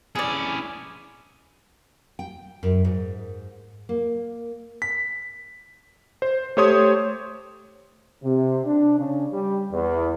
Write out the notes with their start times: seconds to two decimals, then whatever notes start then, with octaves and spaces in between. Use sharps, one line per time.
0.15 C#4 E4 G#4 D5
2.19 G5
2.63 F#2
2.85 G#2
3.89 A#3
4.82 B6
6.22 C5
6.57 A3 G4 C5 C#5 C6 D#6
8.22 C3
8.65 D4
8.97 C#3
9.30 G3
9.71 E2